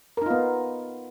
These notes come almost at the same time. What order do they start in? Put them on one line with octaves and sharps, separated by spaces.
A#4 D#4 F4 B3